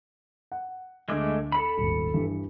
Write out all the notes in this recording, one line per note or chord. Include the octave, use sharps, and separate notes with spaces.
F#5
D2 D3 G#3 A3 D6
A4 B5
D#1 G#1
G2 E3 G3